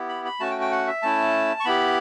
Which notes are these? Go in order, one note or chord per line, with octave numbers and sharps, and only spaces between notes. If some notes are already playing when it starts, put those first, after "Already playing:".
Already playing: B3 E4 G4
B5
B5
A3 C#4 F#4 A5
G5
G5
F#5
E5
A3 C#4 E4 A5
C#6
B3 E4 G4 B5